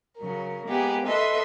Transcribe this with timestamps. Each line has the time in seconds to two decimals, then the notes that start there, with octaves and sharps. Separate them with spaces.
0.18 C#3 F#3 A#4
0.66 G#3 A#3 B3 G4 G#4
1.06 A4 B4 D#5 E5 C6